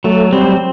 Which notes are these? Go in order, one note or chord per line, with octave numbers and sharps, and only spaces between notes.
F#3 A3
G3 C4